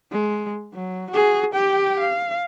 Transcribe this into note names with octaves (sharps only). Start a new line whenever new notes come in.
G#3
F#3
F#4 G#4
G4 G5
F5